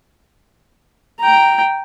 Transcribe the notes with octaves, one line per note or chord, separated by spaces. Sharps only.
G5 A#5